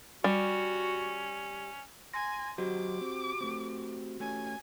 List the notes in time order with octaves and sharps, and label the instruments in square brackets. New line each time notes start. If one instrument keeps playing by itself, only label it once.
[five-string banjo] G3 [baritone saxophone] C#4 [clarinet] F#4
[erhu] G#5 [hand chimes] C6 A#6
[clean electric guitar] F#3 C5 D#5 [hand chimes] F#4 G4 [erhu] D6
[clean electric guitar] C4
A3 C4
[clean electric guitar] A3 C#4 [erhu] G#5